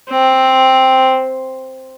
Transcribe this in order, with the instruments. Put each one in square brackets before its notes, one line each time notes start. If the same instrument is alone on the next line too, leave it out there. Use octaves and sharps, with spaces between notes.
[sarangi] C4